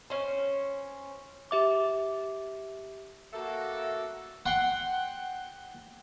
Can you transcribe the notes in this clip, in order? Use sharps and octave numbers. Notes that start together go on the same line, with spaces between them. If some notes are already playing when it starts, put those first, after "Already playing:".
C#4 C5
G4 E5 D6
A#3 F#4 A4 E5
F#5 G5 C6